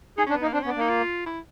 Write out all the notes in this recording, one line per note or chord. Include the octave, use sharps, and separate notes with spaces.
D#4 G#4
C#4
D4
B3
D#4
A#3
C4 D4
B3 C#4
D4
A#3 D#4
F4
E4